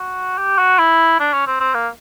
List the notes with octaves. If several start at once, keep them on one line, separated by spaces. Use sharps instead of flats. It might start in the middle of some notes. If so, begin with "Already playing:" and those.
Already playing: F#4
G4
F#4
E4
D4
C#4
C4
C4
A#3